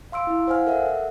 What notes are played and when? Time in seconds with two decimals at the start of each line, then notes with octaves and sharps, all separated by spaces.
0.12 F5 C6 E6 D7
0.27 E4
0.47 C5 F5 F#5 G#5 F6
0.67 A4 A#4 E5 F#5
0.86 A4